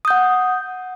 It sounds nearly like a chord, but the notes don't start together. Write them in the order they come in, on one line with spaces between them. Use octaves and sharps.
D#6 G6 F#5